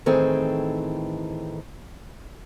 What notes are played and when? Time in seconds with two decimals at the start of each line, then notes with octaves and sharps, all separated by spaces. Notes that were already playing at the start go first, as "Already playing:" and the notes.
0.06 A2 D#3 E3 C4 G#4 A4